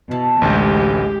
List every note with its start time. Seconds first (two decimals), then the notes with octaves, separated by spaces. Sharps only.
0.11 B2 E4 A5
0.42 A1 D2 G#3 G4